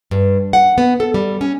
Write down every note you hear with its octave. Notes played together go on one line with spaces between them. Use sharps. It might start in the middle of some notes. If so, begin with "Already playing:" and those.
G2
F#5
B3
A4
G3
C#4